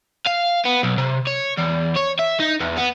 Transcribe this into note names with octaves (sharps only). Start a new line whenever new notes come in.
F5
B3
B1
C3
C#5
E2
C#5
E5
D#4
E2
B3